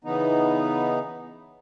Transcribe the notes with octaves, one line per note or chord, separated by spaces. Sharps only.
C#3 E3 B3 D#4